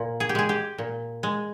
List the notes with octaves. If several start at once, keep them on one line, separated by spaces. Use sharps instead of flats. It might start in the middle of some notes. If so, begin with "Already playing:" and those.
Already playing: A#2 F4
G#4
G4
G#3 G#4
G4
A#2
G#3